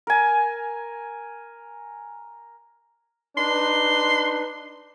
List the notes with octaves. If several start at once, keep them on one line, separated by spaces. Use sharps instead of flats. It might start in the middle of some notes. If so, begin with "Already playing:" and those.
A#4 G#5
D4 D#4 B4 C6